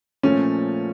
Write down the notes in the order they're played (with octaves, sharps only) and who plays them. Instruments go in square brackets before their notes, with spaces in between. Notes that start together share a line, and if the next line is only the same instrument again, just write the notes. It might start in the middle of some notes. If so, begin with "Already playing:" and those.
[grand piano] A#2 F3 A3 [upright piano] C#4